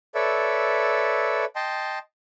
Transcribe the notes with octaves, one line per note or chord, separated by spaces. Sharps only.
A4 B4 C#5 D5 E5
D#5 G5 A5 C6